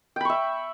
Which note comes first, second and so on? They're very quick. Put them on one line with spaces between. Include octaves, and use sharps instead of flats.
G5 B5 C#6 E5